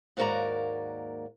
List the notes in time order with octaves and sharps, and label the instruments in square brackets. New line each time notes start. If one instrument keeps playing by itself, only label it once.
[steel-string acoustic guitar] D#2 G#2 A#3 F#4 D5 A#5